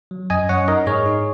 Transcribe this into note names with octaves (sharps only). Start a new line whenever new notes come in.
F#3
F#2 D#5 G#5
F#2 C#5 F#5
D#4 A#4 D#5
G#2 G#4 C#5
D#4